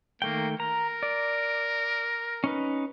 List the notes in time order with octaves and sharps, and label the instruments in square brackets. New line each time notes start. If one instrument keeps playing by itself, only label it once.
[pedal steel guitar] D#3 A3 G5 [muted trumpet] A#3
[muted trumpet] A#4 [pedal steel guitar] A#5
[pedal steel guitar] D5
C#4 D#4 B4